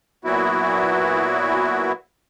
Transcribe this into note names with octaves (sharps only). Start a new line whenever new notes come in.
A#2 F#3 B3 E4 F#4